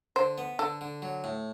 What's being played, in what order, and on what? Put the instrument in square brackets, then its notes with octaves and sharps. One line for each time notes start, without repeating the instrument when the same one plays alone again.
[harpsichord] D3 [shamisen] C5
[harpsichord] B3
[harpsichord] D3 [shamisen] A4
[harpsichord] D3
F#3
A2